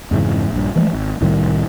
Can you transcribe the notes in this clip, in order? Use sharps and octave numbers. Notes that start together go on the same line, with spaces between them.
F2 G#2 C#3 E3
A#1 G2
E3 F3 G#3 A3
G#1
C2 A2 D#3 G3